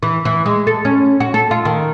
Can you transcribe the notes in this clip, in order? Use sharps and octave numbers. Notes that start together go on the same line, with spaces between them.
E3
E3
G#3
A4
C#4
F#4
A4
F4
D#3